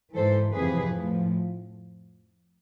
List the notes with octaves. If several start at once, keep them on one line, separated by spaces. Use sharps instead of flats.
G#2 E3 A4 C5
F2 C3 E3 G#4 B4
A2 F3